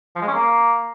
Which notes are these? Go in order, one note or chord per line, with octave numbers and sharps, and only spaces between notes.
F3
G#3
C#4
A#3